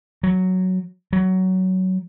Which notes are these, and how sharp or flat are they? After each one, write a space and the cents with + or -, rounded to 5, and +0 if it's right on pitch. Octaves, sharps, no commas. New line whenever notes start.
F#3 +0
F#3 +15